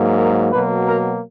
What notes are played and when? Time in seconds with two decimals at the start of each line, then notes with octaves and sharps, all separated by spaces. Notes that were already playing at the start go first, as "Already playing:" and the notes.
Already playing: G#2 F#3 A#3
0.18 A#4
0.52 B2 F#3 A#3 B4
0.87 A#4